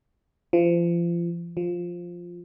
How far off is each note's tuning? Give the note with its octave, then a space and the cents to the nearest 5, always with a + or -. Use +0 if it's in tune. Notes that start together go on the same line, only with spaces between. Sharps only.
F3 -30
F3 +5